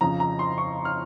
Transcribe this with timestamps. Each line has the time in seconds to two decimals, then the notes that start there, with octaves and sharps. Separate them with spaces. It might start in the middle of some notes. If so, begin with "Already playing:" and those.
0.01 F2 C#3 F3 A#5
0.20 A#5
0.39 C6
0.58 C#6
0.85 F6